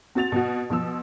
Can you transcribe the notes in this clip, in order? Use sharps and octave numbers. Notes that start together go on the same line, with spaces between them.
C4 F#4 A6 F7
B2 F#4
B2 F3 E6